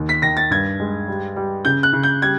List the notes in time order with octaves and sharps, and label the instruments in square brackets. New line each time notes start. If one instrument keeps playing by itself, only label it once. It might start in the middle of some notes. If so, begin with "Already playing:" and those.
Already playing: [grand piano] D#2
[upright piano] B6
[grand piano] D#3 [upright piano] A#6
[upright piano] A6
[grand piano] G2 [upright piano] G#6
[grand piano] G#3
G3
G3
[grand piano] C#3 [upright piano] G6
[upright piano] F#6
[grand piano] C#3
[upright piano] G6
[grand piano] G3 [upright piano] G#6